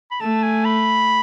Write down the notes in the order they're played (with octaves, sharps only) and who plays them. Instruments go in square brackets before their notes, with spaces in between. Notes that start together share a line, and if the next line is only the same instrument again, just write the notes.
[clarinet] B5
[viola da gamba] A3 [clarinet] A5
[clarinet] G#5
B5